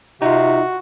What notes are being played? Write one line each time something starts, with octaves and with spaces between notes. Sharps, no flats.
C3 D#4 F4 F#4